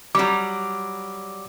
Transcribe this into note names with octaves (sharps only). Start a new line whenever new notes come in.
F#3 G3 D6